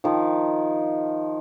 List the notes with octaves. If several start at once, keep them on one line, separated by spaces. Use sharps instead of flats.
D#3 F3